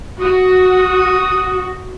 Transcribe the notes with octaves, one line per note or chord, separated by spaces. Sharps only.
F#4 D#6